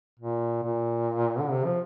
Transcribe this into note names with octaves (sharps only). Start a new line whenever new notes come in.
A#2
A#2
D3
C3
F3